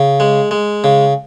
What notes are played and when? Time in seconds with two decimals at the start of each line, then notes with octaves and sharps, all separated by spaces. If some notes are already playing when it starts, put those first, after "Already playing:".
Already playing: C#3
0.20 G#3
0.51 G#3
0.84 C#3